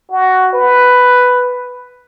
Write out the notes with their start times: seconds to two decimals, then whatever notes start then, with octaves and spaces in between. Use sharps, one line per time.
0.11 F#4
0.53 B4